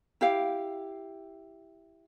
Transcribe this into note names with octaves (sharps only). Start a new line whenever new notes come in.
E4 G4 F5